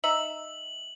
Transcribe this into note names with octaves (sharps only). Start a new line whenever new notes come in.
D#4 E5 F#7